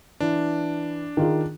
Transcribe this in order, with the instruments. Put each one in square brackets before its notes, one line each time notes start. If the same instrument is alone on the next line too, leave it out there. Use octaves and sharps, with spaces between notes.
[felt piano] E3 [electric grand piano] D4
[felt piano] D#3 F4 G#4